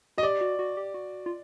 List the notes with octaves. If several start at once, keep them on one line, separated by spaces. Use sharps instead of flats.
F#4 D#5
G4 D5
F#4
F#4
G4
F#4
F4